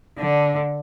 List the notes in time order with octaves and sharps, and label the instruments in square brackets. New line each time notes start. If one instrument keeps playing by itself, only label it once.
[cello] D3